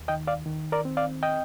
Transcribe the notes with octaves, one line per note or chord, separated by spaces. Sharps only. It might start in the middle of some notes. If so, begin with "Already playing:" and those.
Already playing: D#2
D#3 D#5 G5
D5 F5
D#3
A#4 D5
C4
D5 F5
D#5 G5